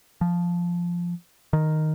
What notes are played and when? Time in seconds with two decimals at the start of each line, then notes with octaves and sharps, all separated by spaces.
0.21 F3
1.53 D#3